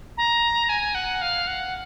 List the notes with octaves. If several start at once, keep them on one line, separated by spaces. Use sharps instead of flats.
A#5
G#5
F#5
F5
F#5